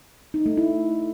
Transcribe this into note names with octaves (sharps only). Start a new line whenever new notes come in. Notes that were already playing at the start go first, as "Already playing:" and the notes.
D#4
A3
E4